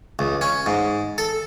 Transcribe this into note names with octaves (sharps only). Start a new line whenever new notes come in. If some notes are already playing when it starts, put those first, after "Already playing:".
C#2
C#4
G#2
A4